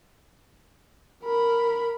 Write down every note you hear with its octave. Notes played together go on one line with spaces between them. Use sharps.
A#4 B5